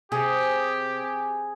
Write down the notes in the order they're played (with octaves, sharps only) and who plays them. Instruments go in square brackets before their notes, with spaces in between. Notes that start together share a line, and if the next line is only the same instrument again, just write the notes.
[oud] C3 [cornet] G4 [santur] G#4